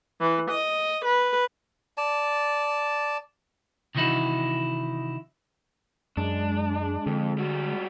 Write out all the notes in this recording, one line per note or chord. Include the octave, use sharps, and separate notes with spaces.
E3
D#5
B4
D5 A5
C3 D#3 E3 D#4 E4 F#4
F#2 G#3 D4
F2 D3
G3 F#4